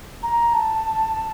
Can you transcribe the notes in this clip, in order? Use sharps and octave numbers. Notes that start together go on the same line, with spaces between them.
A#5
A5